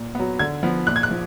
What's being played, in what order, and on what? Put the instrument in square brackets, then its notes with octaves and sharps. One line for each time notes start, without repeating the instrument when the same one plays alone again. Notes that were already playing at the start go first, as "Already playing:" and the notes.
Already playing: [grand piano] A#2
F#3 B3
D3 G#6
F3 B3
A#2 F#6
G#6
F#6
F3